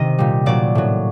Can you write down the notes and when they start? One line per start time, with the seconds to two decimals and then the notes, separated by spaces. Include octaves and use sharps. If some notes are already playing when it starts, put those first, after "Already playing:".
Already playing: C3 D#3 D#5
0.19 A#2 G3
0.46 A#2 F#3 D5
0.75 A2 F#3